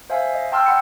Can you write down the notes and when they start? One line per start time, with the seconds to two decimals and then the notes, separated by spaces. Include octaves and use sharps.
0.10 C5 E5 F5 G#5
0.34 D#5
0.52 G5 A5 C6 E6 F6
0.66 F#5 B5 C6 C#7